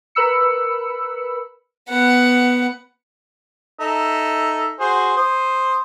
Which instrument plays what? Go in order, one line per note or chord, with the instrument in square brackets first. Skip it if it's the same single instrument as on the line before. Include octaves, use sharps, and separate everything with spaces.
[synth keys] A#4 B4 B5 E6 C#7
[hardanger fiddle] B3 F#5
[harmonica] D#4 A4 E5
F#4 G#4 C5
C5 D#6